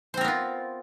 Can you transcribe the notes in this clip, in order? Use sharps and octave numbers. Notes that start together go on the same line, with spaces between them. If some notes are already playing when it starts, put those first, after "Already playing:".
B3 C4 F4 A#4 C5